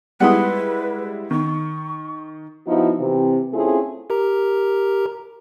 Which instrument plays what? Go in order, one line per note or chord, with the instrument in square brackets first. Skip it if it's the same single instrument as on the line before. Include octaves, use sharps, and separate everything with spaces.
[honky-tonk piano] G3 G#3 E4 [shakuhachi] B4 [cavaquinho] F#5 C6 D#6
[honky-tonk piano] D#3 [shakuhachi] C#6
[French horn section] F3 B3 D#4 E4 F#4
C3 E3 C4
A3 C4 C#4 E4 F4 G#4
[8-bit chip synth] G4 A#4 A#5